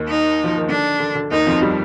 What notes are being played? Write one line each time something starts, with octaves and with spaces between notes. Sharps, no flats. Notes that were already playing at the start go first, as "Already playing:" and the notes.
Already playing: D#2 D#3
D#4
F3
D#3
D3 D4
D3
D3
D#2 D#3 D#4
F2 F3
G3